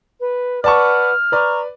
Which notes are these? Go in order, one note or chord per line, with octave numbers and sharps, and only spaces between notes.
B4
B4 D5 F#5 A5 C#6 F6
B4 D5 A#5 C#6